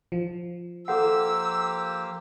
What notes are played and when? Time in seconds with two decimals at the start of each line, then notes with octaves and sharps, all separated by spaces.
0.12 F3
0.88 A#3 G4 A4 C5 F#5 E6